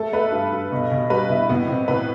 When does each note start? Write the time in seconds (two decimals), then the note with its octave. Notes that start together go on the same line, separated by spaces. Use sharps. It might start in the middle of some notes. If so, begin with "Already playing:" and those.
Already playing: A3 A4
0.13 A3 B4
0.32 G2
0.52 G2
0.72 B2
0.91 B2
1.10 G3 B4
1.29 B2 E4
1.49 A2 B3
1.68 A2 C4
1.88 A2 B4